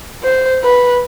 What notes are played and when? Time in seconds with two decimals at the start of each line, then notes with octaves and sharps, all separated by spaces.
0.23 C5
0.64 B4